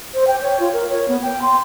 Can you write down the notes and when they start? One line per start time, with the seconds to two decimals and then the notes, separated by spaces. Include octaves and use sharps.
0.14 C5
0.27 G5
0.42 C#5
0.60 F4
0.73 A#4
0.90 C#5
1.08 B3
1.22 G5
1.42 C6